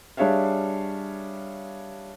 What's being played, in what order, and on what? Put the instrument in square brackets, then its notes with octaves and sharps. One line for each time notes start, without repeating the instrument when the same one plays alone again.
[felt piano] G3 D4 G#4 C#5 E5 F5